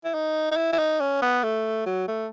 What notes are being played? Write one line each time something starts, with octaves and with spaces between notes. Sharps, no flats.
E4
D#4
D#4
E4
E4
D#4
C#4
B3
A3
F#3
A3